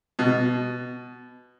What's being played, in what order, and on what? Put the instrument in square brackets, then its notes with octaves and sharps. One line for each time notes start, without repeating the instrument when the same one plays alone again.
[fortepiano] B2